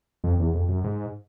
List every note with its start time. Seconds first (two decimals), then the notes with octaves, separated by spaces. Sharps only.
0.24 F2
0.39 E2
0.54 F2
0.69 F#2
0.84 G#2